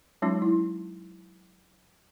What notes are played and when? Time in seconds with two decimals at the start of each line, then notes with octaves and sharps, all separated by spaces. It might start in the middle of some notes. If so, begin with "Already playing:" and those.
0.22 F#3 G#3 C#4 D#4 F4
0.42 E4